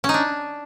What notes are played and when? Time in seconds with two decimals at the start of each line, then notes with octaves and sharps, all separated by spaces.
0.04 C#4
0.09 D#4
0.14 D4